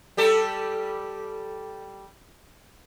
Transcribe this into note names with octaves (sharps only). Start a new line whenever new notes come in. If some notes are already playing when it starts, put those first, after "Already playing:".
G3 G4 A4